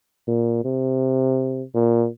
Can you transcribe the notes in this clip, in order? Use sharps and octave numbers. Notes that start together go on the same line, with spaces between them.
A#2
C3
A#2